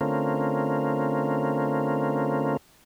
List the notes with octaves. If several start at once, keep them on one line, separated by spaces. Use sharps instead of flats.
D3 A3 C4 C#4 F4 A#4